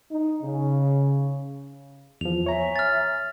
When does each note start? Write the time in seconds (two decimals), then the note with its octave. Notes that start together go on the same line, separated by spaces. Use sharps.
0.12 D#4
0.43 C#3
2.21 E2 F3 F7
2.46 C#5 E5 G#5 A#5
2.76 F6 A6